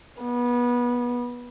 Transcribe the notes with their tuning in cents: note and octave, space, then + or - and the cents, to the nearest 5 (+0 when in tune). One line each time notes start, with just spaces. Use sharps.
B3 -25